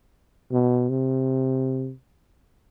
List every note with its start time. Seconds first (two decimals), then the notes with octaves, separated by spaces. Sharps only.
0.52 B2
0.90 C3